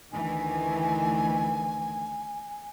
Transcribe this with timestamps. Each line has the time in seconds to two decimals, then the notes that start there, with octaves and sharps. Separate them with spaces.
0.12 D2 D#3 E3 G#5